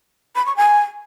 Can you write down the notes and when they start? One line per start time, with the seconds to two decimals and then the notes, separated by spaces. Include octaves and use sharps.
0.36 B5
0.46 C#6
0.56 G#5